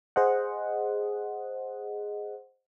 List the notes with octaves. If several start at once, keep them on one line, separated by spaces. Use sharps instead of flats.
G#4 C5 D#5 F#5